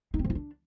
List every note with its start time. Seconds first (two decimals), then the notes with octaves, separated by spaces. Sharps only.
0.14 D#4
0.19 C4
0.24 F3
0.30 E4
0.35 D4